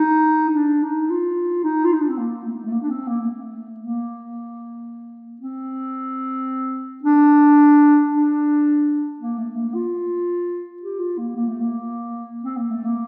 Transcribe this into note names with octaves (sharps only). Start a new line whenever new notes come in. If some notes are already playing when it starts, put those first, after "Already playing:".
Already playing: D#4
D#4
D4
D#4
F4
D#4
F4
D#4
D4
C4
A#3
A3
A3
A#3
D4
C4
A#3
A#3
A3
A#3
C4
D4
D4
A#3
A3
A#3
F4
G4
F4
A#3
A#3
A3
A#3
C4
A#3
A3
A#3